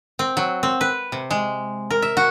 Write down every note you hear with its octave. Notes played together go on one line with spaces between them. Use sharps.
C4
F#3
C4
B4
C3
G#3
A#4
E5
F#4